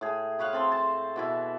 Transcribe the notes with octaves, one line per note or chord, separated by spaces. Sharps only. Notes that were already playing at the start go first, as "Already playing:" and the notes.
A2 G#4
B4 C#5 F5 F#5
C4 A4 F5 C6
A5
B2 E3 E4